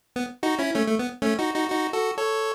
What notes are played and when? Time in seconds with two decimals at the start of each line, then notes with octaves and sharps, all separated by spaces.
0.16 B3
0.43 D#4 F#4
0.59 C#4 E4
0.75 A3 C#4
0.87 A3
0.99 B3
1.22 A3 C#4
1.39 D#4 F#4
1.54 D#4 F#4
1.70 D#4 F#4
1.93 F#4 A4
2.18 A4 C#5